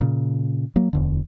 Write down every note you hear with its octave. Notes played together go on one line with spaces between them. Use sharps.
A#2 C#3
F#3 A#3
D1 E2 D3